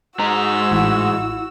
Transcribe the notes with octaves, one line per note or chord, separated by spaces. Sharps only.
G#2 G#3 F#4 A#5 E6
A1 E4